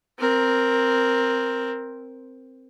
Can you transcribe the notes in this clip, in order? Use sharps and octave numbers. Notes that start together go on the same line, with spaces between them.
C4 A#4